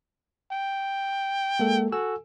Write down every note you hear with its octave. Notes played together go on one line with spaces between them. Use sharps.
G5
G#3 A#3 A4
F#4 A4 G#5 E6